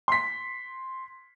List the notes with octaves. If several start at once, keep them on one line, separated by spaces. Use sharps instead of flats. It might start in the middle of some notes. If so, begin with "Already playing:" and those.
C6 B6